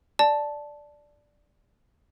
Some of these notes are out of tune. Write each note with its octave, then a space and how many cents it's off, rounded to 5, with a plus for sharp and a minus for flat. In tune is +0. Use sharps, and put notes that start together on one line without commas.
D5 +0 A5 -10